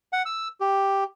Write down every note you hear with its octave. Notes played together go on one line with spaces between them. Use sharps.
F#5
E6
G4